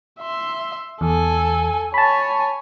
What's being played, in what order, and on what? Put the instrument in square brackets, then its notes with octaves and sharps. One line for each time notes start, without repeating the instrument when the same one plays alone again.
[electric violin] E5 C6
[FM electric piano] E2 [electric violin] A4 G#5
[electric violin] C#5 G#5 [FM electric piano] A5 B5